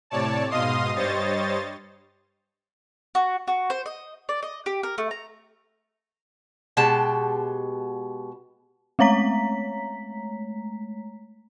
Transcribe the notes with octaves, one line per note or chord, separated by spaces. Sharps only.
A2 C3 C#5 D5 A5
G#2 B2 D#5 F5 C6 D#6
G2 G3 C5 C#5 D#5 A6
F#4
F#4
C5
D#5
D5
D#5
G4
A#4
A3
A#5
B2 G#3 G4 A5
G#3 A3 C#5 A#5 B6